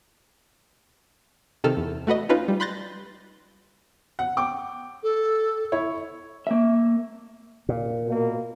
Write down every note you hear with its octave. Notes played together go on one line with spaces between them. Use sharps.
C3 D#3 A4 F6
E2
A3 F#4 B4 D#5
C#4 D#4 F4 B4
G3
B5 C6 F#6 G6 A6 A#6
F#5
G5 D6
A4
E4 C#5
A#3 E5
A#2
B2 A#3